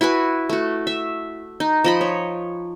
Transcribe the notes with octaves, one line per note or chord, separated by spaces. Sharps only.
E4 F#4 B4 G#5
A3 F#4
E5
D#4
F3 D#5 B5
C#5